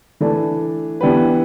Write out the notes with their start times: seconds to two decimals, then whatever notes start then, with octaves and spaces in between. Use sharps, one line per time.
0.20 E3 A3 D4
1.00 E3 B3 D4 G4 B4